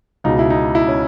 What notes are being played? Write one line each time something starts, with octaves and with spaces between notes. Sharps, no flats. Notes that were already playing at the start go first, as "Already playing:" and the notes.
C#2 B2 D#4
E4
D#4
E4
C#4